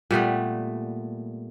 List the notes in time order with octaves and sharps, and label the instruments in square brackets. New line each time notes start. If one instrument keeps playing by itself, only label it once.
[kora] A#2 G3 A3 B3